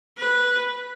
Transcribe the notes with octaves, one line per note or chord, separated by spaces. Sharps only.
B4